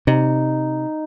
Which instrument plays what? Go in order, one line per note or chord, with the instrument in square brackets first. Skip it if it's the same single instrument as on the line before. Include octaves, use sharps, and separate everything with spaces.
[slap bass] C3 [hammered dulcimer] D#4